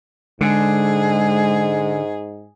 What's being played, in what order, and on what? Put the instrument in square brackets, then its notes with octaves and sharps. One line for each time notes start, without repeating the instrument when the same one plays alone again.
[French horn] G#2 [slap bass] D3 [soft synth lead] G#3 [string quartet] G#4